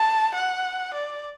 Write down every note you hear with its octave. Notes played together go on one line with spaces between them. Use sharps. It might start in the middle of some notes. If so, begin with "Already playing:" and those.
Already playing: A5
F#5
D5